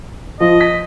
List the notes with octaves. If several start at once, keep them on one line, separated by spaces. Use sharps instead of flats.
F3 D#5
B6